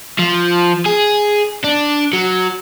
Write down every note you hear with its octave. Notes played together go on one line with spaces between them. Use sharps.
F3
G#4
D4
F#3